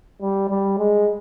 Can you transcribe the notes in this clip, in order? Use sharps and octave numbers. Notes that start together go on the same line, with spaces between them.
G3
G3
G#3